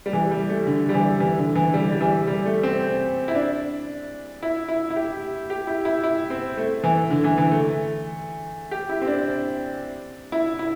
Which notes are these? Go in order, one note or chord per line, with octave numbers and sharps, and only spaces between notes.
G3
E3
G3
A3
D3
G3
E3
E3
D3
E3
G3
G3
E3
G3
A3
C4
E4
D4
E4
E4
E4
G4
G4
E4
E4
E4
C4
A3
E3
D3
E3
E3
A3
G4
E4
C4
D4
E4
E4